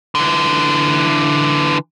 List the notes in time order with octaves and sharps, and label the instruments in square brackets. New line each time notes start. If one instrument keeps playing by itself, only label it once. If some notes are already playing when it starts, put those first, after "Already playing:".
[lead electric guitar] D3 E3